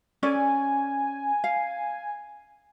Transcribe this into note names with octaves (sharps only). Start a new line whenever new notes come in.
C#4 A4 D5 G#5
F5